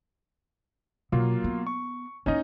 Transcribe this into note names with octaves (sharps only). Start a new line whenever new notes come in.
B2 F#3 A#3 F4
B3
C#6
A#3 C#4 D#4 E4 D#5